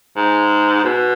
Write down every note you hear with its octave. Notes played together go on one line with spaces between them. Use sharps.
G#2
B2